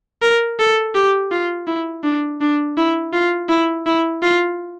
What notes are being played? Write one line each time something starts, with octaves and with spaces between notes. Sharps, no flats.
A#4
A4
G4
F4
E4
D4
D4
E4
F4
E4
E4
F4